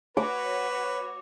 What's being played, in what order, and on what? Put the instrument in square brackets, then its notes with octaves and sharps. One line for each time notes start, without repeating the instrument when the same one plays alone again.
[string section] F#4 C#5 [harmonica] B4 [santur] D6